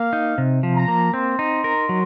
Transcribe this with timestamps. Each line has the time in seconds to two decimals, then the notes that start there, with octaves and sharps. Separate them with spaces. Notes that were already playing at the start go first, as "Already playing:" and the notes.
Already playing: A#3 F5
0.13 D#4
0.38 C3
0.63 F3
0.75 A#5
0.88 A#3
1.13 C4 C6
1.39 D#4
1.64 A#4
1.89 F#3